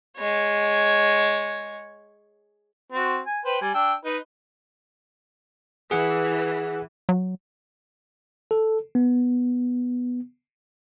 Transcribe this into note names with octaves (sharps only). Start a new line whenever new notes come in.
G#3 C#5
C4 F#4
G#5
B4 C5 G5
G3 G#5
D4 G5 E6
D#4 B4
E3 G#4 F#5
F#3
A4
B3